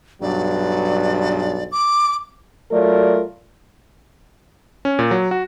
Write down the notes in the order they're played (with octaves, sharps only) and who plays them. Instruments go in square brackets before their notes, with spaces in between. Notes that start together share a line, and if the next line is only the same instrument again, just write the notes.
[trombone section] B1 G2 F#3 [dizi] D5
[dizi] D6
[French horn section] F#3 A3 F4 A#4 D5
[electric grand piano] C#4
A#2
F#3
F#4